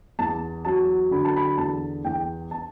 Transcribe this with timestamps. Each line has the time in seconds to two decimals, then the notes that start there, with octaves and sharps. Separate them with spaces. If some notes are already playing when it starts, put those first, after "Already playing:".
0.19 E2 A5
0.65 F#3 A5
1.11 D3 B5
1.25 A5
1.37 B5
1.58 E2 A5
2.05 E2 G5
2.51 A5